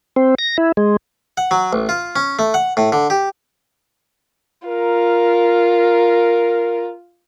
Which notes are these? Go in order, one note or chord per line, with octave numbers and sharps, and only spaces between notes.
C4
A#6
E4
G#3
F#5
F#3
A1
F4
C#4
A3
F#5
A2
D3
G4
F4 A#4